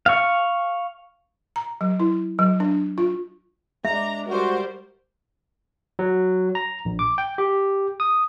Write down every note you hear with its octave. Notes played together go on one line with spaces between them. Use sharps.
F5 C#6
A#5
F#3
E4
F#3
D4
F4
G#3 D4 E5 A#5
G3 F#4 A#4 C5
F#3
A#5
A#1
D6
G5
G4
D#6